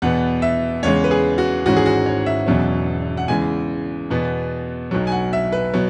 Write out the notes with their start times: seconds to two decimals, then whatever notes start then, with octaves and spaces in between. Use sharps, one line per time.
0.02 E2 B2 B3 F#5
0.42 E5
0.83 E2 C#3 G#3 C#5
1.04 B4
1.11 G#4
1.38 F#4
1.65 G#1 G#2 E3 G#3 C#4 F#4
1.77 G#4
1.86 F#4
2.06 C#5
2.26 E5
2.46 E1 E2 B2 F#3 C#4
3.17 F#5
3.28 E2 C#3 E3 G#3 G#5
4.10 E2 B2 B3
4.91 B1 B2 F#3
5.07 G#5
5.12 F#5
5.33 E5
5.52 B4
5.74 B2 F#3